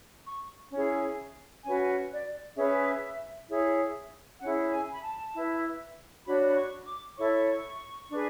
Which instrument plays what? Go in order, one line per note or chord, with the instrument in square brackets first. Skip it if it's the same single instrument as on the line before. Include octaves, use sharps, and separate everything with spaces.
[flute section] C#6
C#4 E4 G#4
C#4 F#4 B4 G#5
D5
C#4 G#4 B4 E5
E4 G#4 C#5
C#4 E4 G#4 F#5
G#5
B5
A5
E4 B4
D4 F#4 C#5 B5
B5
C#6
D6
E4 A4 C#5 C#6
D4 G#4 B4